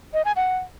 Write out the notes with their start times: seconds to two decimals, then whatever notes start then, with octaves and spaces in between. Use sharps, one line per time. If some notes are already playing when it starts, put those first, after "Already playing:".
0.14 D#5
0.25 G#5
0.36 F#5